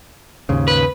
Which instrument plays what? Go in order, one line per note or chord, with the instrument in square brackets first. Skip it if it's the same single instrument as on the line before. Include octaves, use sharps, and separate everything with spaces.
[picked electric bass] D#2 G#2 C#3
[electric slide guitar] B4